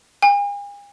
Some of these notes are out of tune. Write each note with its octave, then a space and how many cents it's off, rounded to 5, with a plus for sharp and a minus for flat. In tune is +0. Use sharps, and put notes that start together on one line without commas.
G#5 -45